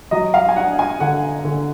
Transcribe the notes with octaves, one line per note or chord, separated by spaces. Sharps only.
F#3 D#5
F5
G#5
D4 F#5
G#5
D3 F#5
D3